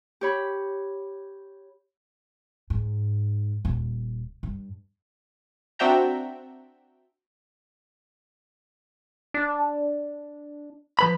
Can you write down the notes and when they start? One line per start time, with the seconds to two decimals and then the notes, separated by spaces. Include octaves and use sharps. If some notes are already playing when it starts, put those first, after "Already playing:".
0.21 G4 C#5 B5
2.70 G#2
3.65 D#1
4.43 G2
5.79 C4 D4 F#4 E5 G5 A#5
9.34 D4
10.99 F3 B4 B5